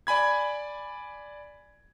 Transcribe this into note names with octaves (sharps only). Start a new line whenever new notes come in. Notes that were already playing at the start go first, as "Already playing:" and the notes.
D5 G#5 B5 G#6